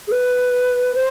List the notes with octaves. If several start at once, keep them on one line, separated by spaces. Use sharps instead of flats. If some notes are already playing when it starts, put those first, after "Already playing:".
G#4
B4
C5